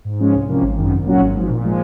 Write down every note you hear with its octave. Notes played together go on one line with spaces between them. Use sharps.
G#2
F3 G#3 C#4
C2
C3 F3 A#3 C#4
G#1
F#2 D#3
C2
A#2 F#3 C#4 F#4
G#1
G#2
F3
A#2
F3 G#3